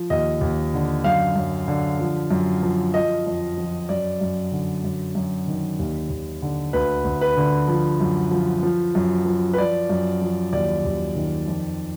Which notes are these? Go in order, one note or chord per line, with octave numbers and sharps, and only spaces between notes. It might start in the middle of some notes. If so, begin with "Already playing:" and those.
Already playing: F3
D#2 D#5
D#2
D3
F#2 F5
F#2
D3
F3
F#2
F3
F3 D#5
F2
F3
F#2 D5
F#2
D3
F#2
F#2
D#3
D#2
D#2
D3
D2 B4
D2
B4
D3
F3
F#2
F3
F3
F#2
F3
B4
F3 D5
F#2
F3
D#2 D5
D#2
D#3
F2